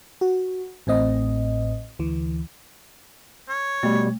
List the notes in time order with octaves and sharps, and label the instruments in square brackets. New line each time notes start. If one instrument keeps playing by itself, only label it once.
[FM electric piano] F#4
A1 A2 C4 D#5
D2 E3
[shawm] C#5
[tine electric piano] B2 G3 [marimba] A3